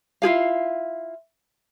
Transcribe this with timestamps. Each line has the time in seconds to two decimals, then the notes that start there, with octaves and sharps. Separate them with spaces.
0.22 E4 F4 G#4 F5